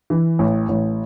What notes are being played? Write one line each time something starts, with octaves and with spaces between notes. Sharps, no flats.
E3
A1
A1